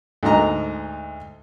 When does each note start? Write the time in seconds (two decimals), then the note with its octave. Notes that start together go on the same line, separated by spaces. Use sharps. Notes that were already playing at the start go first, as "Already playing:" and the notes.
0.23 D2 G#2 D#5 A#5